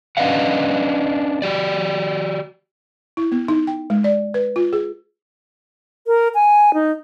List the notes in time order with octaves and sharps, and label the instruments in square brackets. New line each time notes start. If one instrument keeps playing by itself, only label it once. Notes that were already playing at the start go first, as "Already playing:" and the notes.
[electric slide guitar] C#4 D4 B4 D#5 F5 F#5
F#4 G4 D5
[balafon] E4
B3
D#4
G5
G#3
D5
B4
F4
G#4
[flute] A#4
G#5
D#4